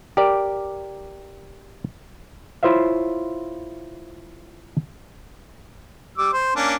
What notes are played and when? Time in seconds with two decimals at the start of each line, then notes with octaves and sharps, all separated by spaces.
0.17 G4 A#4 D5
2.63 E4 F4 C5 C#5 E5 F5
6.18 G3 D6 E6
6.33 C5
6.56 A#3 C#4 D4